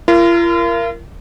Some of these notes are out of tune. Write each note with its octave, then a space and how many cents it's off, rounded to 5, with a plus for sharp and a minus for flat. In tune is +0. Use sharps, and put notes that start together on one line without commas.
F4 -45 A#4 +0